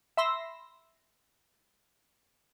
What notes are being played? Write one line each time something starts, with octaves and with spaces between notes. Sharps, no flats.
E5 B5 C6 E6 A#6